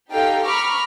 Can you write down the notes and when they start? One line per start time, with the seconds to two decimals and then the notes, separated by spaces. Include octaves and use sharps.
0.11 D#4 G4 A4 F5 G5
0.48 A#5 B5 C#6 D6 F6